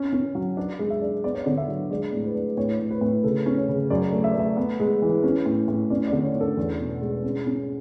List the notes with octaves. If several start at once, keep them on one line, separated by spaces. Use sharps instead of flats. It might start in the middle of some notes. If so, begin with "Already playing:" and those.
Already playing: C#4
C#4
F#3
D4 D5
G#3
E5
D4
B3 D5
C#5
D3 D5
E5
F#3
G#3 D5
A2
B4
D4
A2 C#5
A2
B4
A2
C#3 A4
C#4
C#5
C#3
F#2 D5
A3
E5
D5
A3 E5
B3
G#3
E3
C#4
A2
A2
C#4 D5
D5
D3
C#5
C#4
A4
E2
B2
G#3
C#4
C#4